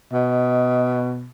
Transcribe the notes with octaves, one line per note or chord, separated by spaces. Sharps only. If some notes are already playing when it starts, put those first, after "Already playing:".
B2 D#5